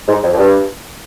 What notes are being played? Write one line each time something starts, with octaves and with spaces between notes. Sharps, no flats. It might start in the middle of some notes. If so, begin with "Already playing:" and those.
G#2
F2
F2
G2